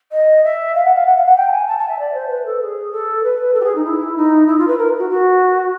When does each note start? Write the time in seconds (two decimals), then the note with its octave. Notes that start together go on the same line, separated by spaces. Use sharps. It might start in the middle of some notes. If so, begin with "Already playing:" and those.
0.12 D#5
0.44 E5
0.75 F5
0.85 F#5
0.95 F5
1.06 F#5
1.17 F5
1.26 F#5
1.37 G5
1.48 A5
1.52 G#5
1.68 A5
1.78 A5
1.89 E5
1.99 D5
2.14 C5
2.30 B4
2.46 A4
2.61 G#4
2.92 A4
3.23 B4
3.54 A4
3.61 G4
3.64 G#4
3.75 D#4
3.85 E4
4.16 D#4
4.47 E4
4.58 F4
4.68 B4
4.78 A#4
4.99 F#4
5.10 F#4